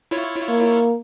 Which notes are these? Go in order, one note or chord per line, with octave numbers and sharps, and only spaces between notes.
E4 F4 C#5
A#3